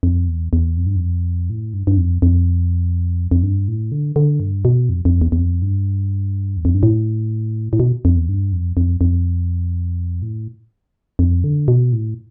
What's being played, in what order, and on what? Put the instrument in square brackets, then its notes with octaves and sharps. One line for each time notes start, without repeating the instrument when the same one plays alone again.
[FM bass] F2
E2
E2
F2
G2
F2
A2
G2
G2
F2
F2
F2
G2
A2
D3
D3
G2
B2
F2
F2
E2
E2
F2
G2
E2
F2
G2
A2
A2
B2
F2
E2
G2
F2
F2
F2
A2
F2
D3
B2
A2